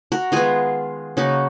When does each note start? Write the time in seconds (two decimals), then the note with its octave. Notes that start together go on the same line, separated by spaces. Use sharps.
0.12 F#4 A#4
0.32 D#3 G#3 B3 F4 G#4
1.17 C#3 F#3 A#3 D#4 F#4